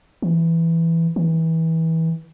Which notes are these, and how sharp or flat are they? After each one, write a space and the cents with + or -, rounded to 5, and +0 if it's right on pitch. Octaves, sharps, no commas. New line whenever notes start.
E3 +5
E3 -25